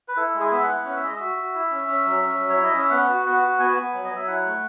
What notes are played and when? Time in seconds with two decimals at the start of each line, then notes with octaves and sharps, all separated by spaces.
0.08 B4
0.17 E4 A4
0.35 G#3
0.40 G#4
0.52 B3 E5
0.63 F#5
0.68 E4
0.85 C#4 F#5
0.96 E5
1.02 G#3 D#5
1.16 F#4 E5
1.37 F#4
1.54 E4
1.71 C#4
1.88 C#4
2.06 F#3
2.22 C#4
2.39 F#3
2.49 C#5
2.57 E4
2.64 D#5
2.74 C#4 E5
2.90 B3 F#5
3.09 F#4
3.25 B3 F#5
3.42 F#4
3.59 B3 G#5
3.77 B3
3.94 F#3
4.04 D#5
4.11 F#3 E5
4.28 E4 F#5
4.45 A3